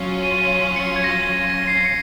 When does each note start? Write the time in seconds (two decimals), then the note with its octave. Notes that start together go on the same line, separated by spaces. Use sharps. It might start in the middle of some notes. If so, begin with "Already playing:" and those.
Already playing: F#3 C#4 F4
0.22 D#7
0.76 C#7
0.96 G#6
1.04 A#6
1.49 A#6
1.67 C7
1.85 C#7